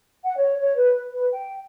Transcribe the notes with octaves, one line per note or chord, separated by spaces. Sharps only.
F#5
C#5
C#5
B4
B4
G5